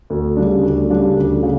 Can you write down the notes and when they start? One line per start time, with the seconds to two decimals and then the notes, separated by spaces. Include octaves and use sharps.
0.10 D2
0.36 C#3 G3 D4
0.63 D2
0.90 C#3 G3 D4
1.17 D2
1.43 C#3